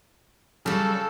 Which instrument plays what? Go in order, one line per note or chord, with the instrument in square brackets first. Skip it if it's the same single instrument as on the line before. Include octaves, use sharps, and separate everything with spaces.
[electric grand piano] C#3 [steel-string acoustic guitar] F#3 G3 [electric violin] A4